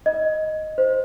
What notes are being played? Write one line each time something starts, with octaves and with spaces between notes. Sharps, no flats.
D#5
C5